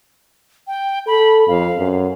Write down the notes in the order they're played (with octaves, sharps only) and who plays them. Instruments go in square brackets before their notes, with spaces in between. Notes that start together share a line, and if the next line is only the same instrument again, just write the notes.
[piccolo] G5
[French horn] A4 [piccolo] B5
[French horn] F2 [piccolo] F5
[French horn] F#2